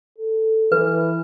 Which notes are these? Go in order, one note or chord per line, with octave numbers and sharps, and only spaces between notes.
A4
E3 B4